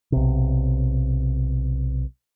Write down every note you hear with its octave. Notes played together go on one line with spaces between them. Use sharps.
B1 C3